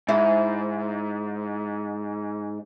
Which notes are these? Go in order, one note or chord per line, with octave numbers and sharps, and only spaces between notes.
G#2 E4